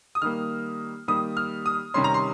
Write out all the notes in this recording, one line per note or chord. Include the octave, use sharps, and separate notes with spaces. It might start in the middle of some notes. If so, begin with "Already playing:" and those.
D#6
D#3 G3 A#3 F6
D#3 G3 A#3 D#6
F6
D#6
C3 D#3 G3 C#4 C6
A#5
C6